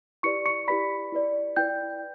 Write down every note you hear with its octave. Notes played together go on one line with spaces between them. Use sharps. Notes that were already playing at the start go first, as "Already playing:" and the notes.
E4 G4 B4 D5 C#6 C#7
C#6 C#7
E4 G4 B4 D5 B5 B6
E4 B4 D5
E4 B4 D5 G5 G6